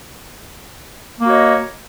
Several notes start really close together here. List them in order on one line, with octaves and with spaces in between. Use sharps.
A#3 F#4 C#5 D#5